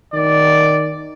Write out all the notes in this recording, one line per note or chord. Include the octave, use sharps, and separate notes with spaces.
D#3 D5